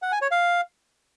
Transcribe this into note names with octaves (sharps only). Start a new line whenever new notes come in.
F#5
G#5
C#5
F5